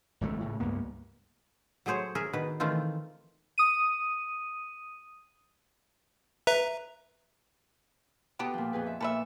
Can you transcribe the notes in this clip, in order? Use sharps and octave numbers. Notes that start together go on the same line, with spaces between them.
G#1 C#2 D3 A3
A2 C#3
C#2 G2 A#3 B3
F#3 A3 G#4 C5 C#5
G#4 A#4 E5
B2 D#3 B4
D#3 E3 A3 C4 F4
D#6 D#7
B4 E5 A#5
B2 B3 G4 A4 D#6
A#2 F3
F2 G#4 B4
E5
A#2 A4 B4 E5